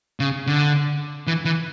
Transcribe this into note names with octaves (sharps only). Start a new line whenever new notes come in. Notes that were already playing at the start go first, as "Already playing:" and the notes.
C#3
D3
E3
E3